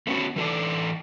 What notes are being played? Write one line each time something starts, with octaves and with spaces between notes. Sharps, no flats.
A3 B3 C#4 F#4
E3 A4 D5